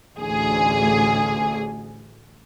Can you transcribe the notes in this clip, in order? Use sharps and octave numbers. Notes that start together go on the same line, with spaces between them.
A1 D2 G#4